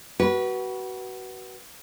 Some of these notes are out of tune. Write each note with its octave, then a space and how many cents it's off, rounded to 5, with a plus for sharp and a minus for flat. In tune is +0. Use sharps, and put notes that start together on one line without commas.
F#4 +25 B4 -20